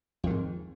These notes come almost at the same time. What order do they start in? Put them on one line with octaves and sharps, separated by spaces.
F2 D#3 G#2